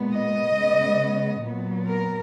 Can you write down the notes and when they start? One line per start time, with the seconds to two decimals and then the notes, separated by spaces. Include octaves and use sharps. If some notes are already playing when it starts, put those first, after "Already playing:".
Already playing: A#2 G#3 B3
0.12 D#5
0.55 C#3 G#3 B3
1.44 A#2 F#3 B3
1.88 A#4